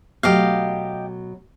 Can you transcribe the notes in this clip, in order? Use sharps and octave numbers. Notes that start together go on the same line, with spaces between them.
B2 F#3 A3 G4 D#5 F5